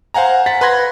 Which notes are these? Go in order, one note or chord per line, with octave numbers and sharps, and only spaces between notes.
C5 F5 F#5 G#5 A#5
F#5 A6 B6
B4 B5 C6 G#6 A#6